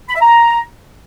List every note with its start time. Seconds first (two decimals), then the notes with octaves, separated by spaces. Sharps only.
0.09 B5
0.15 E5
0.22 A#5